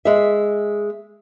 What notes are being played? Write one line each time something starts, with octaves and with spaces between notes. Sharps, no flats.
G#3 E5